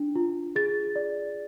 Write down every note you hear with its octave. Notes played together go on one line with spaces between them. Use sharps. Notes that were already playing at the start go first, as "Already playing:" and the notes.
Already playing: D4
F4
G#4 A6
D5